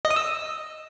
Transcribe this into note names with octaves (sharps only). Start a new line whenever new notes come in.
D#5
D#6
E6